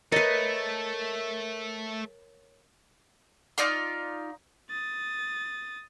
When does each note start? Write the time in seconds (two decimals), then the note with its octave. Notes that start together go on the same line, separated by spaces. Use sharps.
0.12 A3 A#4 B4 C#5 D#5 A6 C#7
3.58 D#4 F4 D5 F5
4.70 D#6 A6